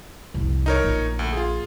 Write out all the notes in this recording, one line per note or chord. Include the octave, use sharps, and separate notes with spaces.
C2 F2
D#4 A#4 C#5
A#1
D2
F4 G#4